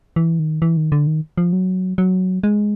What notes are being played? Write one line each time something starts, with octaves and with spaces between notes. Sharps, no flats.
E3
D#3
E3
D#3
D3
D#3
F3
F#3
F#3
G#3